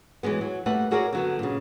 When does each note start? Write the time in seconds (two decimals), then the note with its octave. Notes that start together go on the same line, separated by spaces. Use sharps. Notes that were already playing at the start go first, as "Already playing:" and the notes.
0.23 E3 F#3 G#3 B3
0.41 F#3
0.66 G3 A3 A#3 B4 F#5
0.91 E4 F#4 G#4 A#4 C#5 D5
1.13 D3 F#3 B3
1.39 A#2 C#3